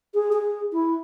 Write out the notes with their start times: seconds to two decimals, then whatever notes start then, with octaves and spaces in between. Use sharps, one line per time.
0.14 G#4
0.33 G#4
0.73 E4